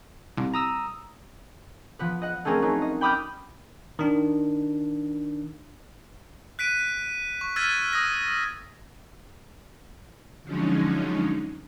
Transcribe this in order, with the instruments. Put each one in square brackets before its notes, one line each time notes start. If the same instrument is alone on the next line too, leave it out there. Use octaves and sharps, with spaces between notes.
[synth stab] C2
[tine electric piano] A#5 D#6 E6
[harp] F3 B3 B4
D#5 F#5
A3 C4 C#4 G#4 A#4
F#3 A3 D#4
D#5
G5 B5 D6 D#6 F6 G6
[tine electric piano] D#3 D4
[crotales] F#6 B6 D7 D#7
C#6
E6 F6 G#6 A6 B6 D#7
D#6 A#6
[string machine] D3 F3 F#3 G#3 C#4 D#4